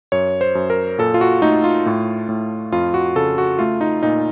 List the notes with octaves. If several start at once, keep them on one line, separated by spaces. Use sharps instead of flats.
F#2 C#5
C5
F#2
A#4
A#2 A4
F4
F#4
A3 D#4
F4
A2
A2
F2 F4
F#4
C#3 A4
F#4
A3 F4
D#4
A#2 D#4